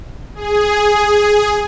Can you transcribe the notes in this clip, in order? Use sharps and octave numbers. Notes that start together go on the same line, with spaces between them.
G#4